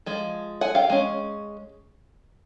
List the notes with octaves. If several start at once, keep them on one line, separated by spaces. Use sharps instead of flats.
F3 G#3
F#5 G#5
F5 G5
G#3 C#4